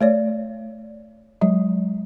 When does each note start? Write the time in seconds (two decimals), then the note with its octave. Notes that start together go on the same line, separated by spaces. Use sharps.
0.01 A3 C#5 D5
1.41 F#3 G#3